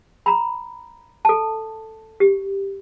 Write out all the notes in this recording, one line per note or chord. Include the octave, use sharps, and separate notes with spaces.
A#5 B5
A4 A5
G4